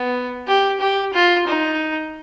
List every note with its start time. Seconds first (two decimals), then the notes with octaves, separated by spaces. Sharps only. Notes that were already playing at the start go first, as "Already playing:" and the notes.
Already playing: B3
0.47 G4
0.80 G4
1.13 F4
1.47 D#4